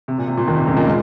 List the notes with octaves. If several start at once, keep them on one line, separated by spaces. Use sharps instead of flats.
C3
A#2
C3
A#2
D#2 D#3
C3
C#2 C#3
A#2 A#3
G#3